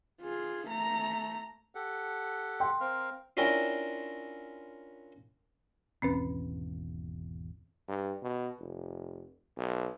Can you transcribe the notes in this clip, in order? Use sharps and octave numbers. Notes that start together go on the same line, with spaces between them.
F4 G#4
A3 A#5
G4 A4 F#5
G5 C6
C4 A#4 F5
C#4 D4 E4 F4 A#4 G5
G#1 E2 B2 C4 C#4 B4
G2
B2
F1
B1